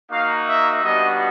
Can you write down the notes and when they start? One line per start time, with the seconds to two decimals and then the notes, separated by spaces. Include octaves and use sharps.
0.11 A#3 D#4 F#4 F5
0.47 E5
0.82 G3 B3 D4 F#4 D#5